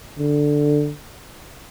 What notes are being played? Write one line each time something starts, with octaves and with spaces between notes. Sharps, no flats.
D3